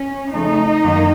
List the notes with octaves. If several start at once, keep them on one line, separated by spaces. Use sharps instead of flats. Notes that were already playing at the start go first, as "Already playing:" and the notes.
Already playing: C#4
F2 C#3 A3 D#4
F#2 D#3 A#3